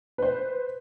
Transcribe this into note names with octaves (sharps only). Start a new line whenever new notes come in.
B4 C5